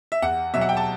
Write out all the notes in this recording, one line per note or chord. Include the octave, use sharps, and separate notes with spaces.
E5
E2 F#5
B2 F#3 E5
F#5
G5
A5